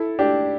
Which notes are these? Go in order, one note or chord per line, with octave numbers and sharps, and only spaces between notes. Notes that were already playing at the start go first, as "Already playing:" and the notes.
Already playing: E4 A4
D4 G4